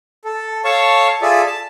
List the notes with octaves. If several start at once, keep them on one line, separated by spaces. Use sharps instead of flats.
A4
A4 C#5 F5 A5 C#6
F4 G#4 A4 D5 E5
A5